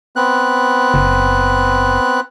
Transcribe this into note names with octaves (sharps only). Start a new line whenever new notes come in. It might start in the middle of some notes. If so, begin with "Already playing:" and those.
B3 C4 F#6
F#1